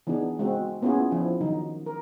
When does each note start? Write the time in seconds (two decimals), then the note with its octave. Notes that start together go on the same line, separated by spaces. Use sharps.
0.07 E3 B3 D4 D#4 G#4
0.39 G#3 C4 F#4
0.82 A#3 B3 C#4 E4 F4 G#4
1.11 F3 D4 E4
1.41 D#3 F#3 D#4
1.86 A#4